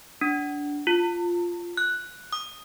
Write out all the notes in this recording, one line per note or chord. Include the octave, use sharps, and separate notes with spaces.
D4
F4
F#6
D#6